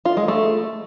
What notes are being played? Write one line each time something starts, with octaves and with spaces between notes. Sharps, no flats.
F4
G#3
A3